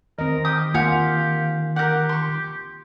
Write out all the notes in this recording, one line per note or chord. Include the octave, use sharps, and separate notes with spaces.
D#3 C4 A#4 D#5
G4 D#6
A#3 F4 G4 F5 F#5 G#5
G4 A#4 F#5
C6 C#6